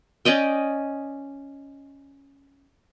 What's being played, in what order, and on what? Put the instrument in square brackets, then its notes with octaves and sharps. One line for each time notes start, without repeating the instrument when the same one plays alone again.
[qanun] C#4 D5 D#5 G5